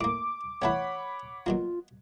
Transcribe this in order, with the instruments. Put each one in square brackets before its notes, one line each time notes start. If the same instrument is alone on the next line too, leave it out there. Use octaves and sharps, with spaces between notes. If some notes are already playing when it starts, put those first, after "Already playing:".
[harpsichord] A2 A#3 [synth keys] D6
[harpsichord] E3 A3 B3 [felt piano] C#5 F#5 B5
[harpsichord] B2 F#3 A#3 [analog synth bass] F4